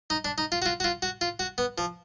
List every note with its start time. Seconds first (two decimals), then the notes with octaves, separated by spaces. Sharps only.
0.10 D#4
0.25 D4
0.38 D#4
0.52 F4
0.62 F#4
0.66 F4
0.80 F#4
0.84 F4
1.02 F#4
1.21 F4
1.39 F#4
1.58 B3
1.78 F3